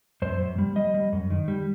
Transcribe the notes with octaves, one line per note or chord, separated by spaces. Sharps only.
F#2 C5
F#2
G3
G3 D#5
G3
F#2
D#3
G3